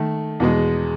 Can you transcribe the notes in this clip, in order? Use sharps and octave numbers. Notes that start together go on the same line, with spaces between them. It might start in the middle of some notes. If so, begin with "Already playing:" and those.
Already playing: D#3 A3
E2 B2 G#3